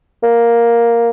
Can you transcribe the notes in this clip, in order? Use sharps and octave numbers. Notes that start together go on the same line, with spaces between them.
A#3